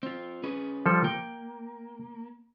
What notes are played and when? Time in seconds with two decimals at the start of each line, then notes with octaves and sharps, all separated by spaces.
0.03 C4 F4
0.44 C#4 G#4 B4
0.86 F3 G3 A4
1.04 A#3 G5